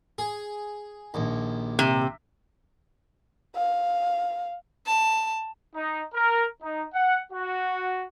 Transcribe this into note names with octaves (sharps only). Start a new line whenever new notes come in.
G#4
A#1 D#2
C3
F5
A5
D#4
A#4
D#4
F#5
F#4